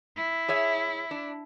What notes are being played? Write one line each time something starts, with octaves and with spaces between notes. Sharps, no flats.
E4
G#4 C#5 E5
D4